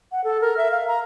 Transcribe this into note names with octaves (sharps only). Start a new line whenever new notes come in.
F#5
A4
A#4
E5
F5
A#5